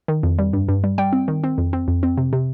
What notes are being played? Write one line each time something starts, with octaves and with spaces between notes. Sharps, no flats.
D#3
F2
G3
G2
G2
G3
G3 G5
C4
D#3
C4
F2
C4
F2
C4
C3
C3